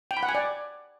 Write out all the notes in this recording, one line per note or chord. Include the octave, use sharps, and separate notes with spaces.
G5
B5
F#5
G#5
D5